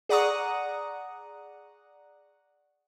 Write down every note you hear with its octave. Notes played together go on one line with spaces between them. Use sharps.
G#4 D5 F#5 A#5 C#6 D#6